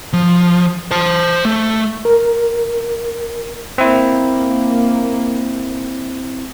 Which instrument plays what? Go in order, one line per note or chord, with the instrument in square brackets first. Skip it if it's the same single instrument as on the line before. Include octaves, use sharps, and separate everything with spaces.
[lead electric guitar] F3
C5 A5
A3
[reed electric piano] A#4
[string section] A#3 [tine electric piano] C4 E4